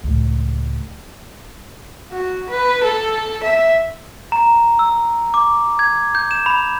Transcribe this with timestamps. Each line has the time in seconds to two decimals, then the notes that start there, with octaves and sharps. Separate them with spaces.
0.04 C#2 A2
2.12 F#4
2.50 B4
2.84 A4
3.43 E5
4.32 A#5
4.79 E6
5.34 D6
5.79 G#6
6.15 G6
6.31 E7
6.46 B5